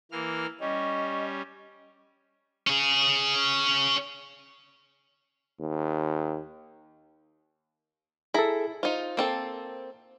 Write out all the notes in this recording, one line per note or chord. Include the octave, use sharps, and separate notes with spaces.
E3 A#3 F6
G3 C#4 D#5 C#6
C#4 G#4
D#2
E4 G#4 A4 A#5
D#4 F4 C5
A#3 C4 A4